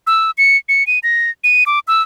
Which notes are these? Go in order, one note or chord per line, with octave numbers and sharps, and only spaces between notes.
E6
C#7
C#7
D#7
A#6
D#7
D6
E6